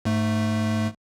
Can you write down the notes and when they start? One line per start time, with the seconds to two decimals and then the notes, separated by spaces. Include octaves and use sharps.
0.05 G#2 A3